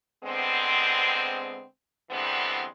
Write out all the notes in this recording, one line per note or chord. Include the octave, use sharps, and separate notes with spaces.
D3 G#3 B3 C4
D3 E3 G3 G#3 B3 C4